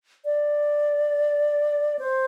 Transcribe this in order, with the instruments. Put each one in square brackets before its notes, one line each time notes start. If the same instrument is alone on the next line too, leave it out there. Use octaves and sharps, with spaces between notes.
[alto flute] D5
C5